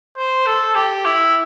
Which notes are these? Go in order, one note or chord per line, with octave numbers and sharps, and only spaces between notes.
C5
A4
G4
E4